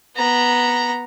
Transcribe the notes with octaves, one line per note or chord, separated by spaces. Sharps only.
B3 A#5